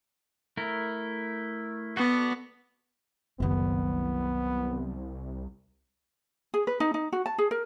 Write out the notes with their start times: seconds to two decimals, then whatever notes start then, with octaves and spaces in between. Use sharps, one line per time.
0.57 A3 E4 A#4
1.97 B3 F#4 A4 D5
3.40 F#1 C2 D#3 F#3 B3
6.54 G#4
6.67 B4
6.80 D#4
6.94 D#4
7.13 F#4
7.26 A5
7.38 G#4
7.51 A#4